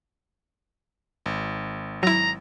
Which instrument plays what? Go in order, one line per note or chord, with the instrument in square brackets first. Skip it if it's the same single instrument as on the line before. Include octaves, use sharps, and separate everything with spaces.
[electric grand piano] G#1
[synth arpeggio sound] F#3 E4 [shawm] A#5